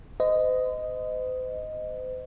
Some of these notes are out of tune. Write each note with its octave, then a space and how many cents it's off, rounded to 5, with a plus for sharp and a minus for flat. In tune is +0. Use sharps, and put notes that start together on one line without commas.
C5 -40 D#5 +0